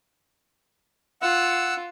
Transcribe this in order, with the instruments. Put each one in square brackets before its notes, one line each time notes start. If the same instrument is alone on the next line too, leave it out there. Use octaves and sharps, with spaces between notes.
[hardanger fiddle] F4 [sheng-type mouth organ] F#5 E6